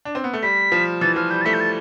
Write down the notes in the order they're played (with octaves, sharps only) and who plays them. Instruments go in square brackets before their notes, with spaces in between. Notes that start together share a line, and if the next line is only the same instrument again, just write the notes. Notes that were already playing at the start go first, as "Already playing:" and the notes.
[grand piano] D4
C4
B3
A3
[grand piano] G3 [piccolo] B6
[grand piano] F3
[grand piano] E3 [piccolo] A6
[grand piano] F3 [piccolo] F6
[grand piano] G3 [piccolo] G6
[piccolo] A6
[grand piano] A3 [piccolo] B6
[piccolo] G6
A6